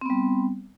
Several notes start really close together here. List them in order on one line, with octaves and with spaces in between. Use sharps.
C4 B3 G3